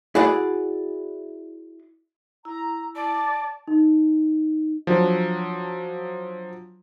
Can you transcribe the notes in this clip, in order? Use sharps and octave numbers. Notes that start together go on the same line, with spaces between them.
E4 F#4 G#4 D5 F#5
E4 A#5
D5 A5
D#4
F3 F#3 D4